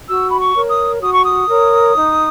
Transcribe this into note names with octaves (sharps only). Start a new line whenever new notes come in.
F#4 E6
B5
C#6
A#4 C#5
D#6
F#4 D#6
C#6
D#6
A#4 C#5
D#4